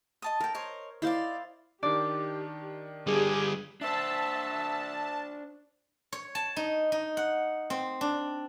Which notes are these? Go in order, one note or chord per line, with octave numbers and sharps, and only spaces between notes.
D#5 A5 D#6
A4 A#4 G5
C5 C#5 D#5
E4 C5 D5 D#5 F5
D#3 D4 G4 D5
D3 G3 G4 G#4
D4 C5 E5 A5
C#5
A5
D#4
D#4
F#5
C4
D4